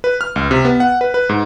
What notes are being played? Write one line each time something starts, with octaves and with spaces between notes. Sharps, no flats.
B4
F6
C#2
C3
B3
F#5
B4
B4
G#2